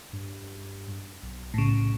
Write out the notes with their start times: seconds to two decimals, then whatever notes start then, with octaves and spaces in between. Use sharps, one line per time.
0.13 G2
1.23 B1
1.54 A2 C#3